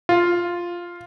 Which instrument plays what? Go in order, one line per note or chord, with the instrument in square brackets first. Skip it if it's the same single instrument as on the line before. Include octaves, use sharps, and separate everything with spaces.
[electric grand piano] F4